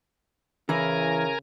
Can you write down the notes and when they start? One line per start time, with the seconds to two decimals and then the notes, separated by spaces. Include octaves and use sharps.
0.69 C#3 E3 E4 A#4 G#5 A#5